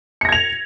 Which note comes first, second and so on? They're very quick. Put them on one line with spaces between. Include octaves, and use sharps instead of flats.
C#7 A#6 G#6 F7